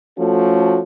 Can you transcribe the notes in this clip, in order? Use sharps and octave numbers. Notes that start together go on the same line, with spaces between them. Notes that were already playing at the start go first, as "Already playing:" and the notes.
F3 A3 C#4 F#4 A4